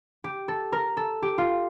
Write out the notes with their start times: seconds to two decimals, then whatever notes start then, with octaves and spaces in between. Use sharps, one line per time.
0.24 G4
0.48 A4
0.72 A#4
0.97 A4
1.22 G4
1.38 F4